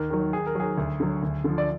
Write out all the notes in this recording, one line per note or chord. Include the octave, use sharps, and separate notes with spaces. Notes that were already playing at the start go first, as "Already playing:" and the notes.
Already playing: D#2 A#4
D#3 F#3
D#2 G#4
A#4
D#3 F#3 G#4
D2
D3 F#3
D2
D3 F3
D5